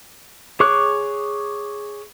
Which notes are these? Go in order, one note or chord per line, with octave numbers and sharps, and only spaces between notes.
G#4 C#5 C#6 D6 F#6